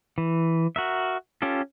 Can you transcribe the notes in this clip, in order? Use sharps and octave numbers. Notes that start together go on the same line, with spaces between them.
E3
F#4 A#4 E5
C#4 F4 G4 A4